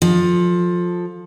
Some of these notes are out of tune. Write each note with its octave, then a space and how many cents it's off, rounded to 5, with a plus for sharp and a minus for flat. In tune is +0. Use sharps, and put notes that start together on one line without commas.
F3 +15 A4 +5